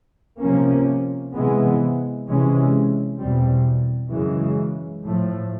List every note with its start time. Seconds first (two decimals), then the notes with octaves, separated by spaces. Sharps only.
0.43 C3 F3 A#3 C#4
1.35 C3 E3 G#3 B3
2.27 C3 E3 G#3 C#4
3.19 E2 B2 G3 C4
4.12 F#2 C#3 E3 G#3
5.03 A2 F3 A3